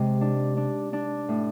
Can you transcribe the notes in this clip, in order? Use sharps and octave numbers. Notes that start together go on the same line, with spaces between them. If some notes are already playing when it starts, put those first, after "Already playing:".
Already playing: C3 G#3
D4
D4
D4
A2